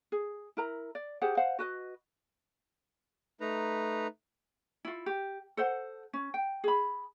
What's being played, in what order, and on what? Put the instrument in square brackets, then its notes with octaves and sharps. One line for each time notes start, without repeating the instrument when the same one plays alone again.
[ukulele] G#4
E4 A#4 A#5
D5
G4 G#4 C5 F#5
C5 F5 F#5
F#4 B4 D#5
[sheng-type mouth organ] A3 D#4 B4 A#5
[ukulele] E4 F4
G4
A4 C5 F#5
C#4
G5
G#4 B5